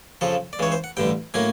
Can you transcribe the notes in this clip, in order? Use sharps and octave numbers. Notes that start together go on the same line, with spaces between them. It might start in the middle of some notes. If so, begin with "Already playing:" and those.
F2 C#3 F3 A4
D5
C#2 C#3 E3 C#5
C5
F#5
A1 G2 D3 G3 G5
A2 F#3 A#3 C#4 G#5